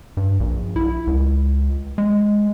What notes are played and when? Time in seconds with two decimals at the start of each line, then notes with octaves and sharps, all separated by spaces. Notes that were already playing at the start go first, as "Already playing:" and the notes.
0.17 G2
0.40 A#1
0.76 E4
1.07 C#2
1.98 G#3